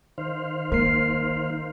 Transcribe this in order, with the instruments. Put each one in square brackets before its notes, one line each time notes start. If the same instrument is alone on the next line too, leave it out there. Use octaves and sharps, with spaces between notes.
[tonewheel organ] D#3 C5 F5
[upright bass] A#3 [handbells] A#4 C7